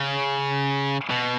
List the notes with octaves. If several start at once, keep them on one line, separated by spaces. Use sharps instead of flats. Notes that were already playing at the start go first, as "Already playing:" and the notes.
Already playing: C#3
B2